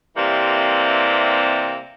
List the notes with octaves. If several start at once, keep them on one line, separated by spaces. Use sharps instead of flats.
C3 E3 G3 A#3 C4